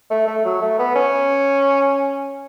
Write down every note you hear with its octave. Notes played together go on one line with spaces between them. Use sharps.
A3
A3
F#3
A3
B3
C#4